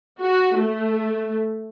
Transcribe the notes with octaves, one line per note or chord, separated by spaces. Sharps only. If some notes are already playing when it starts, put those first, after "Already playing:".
F#4
A3